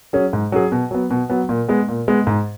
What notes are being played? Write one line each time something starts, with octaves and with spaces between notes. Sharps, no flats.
F#3 C#4 G#4
G#2
F#3 C#4 G#4
B2
F#3 B3
B2
F#3 B3
A#2
G#3 B3
A#2
G#3 B3
G#2